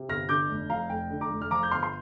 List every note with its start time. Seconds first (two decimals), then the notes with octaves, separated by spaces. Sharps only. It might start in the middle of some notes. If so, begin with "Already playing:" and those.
Already playing: C3
0.09 G1 F6 A#6
0.29 D3 D6 G6
0.49 F1
0.70 F2 F5 A#5
0.90 F1 G5
1.10 D3
1.21 A#5 D6
1.31 F1
1.42 F6
1.51 F3 A#5 D6
1.63 G6
1.71 G1 C6 F6
1.83 C6